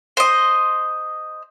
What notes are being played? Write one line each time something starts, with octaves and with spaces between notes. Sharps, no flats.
C5 D#5